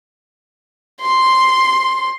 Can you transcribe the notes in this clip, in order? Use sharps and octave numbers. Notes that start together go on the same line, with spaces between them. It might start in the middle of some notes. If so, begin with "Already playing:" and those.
C6